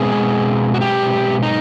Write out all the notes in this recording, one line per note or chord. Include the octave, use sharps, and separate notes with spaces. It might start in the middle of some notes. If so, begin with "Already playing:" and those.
Already playing: B2 G#3 C4 G#4
F#4
G4
D#4